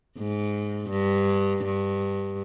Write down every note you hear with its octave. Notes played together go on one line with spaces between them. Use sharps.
G#2
G2
G2